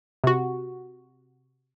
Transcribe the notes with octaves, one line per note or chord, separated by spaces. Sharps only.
C3 F#4